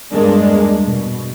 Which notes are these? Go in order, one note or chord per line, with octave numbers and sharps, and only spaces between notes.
E2 G2 G#3 A#3 D4
B2